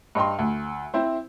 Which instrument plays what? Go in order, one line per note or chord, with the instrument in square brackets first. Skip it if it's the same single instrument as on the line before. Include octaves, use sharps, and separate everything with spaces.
[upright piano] G2 D#5 G5 C6
D2
C4 E4 C5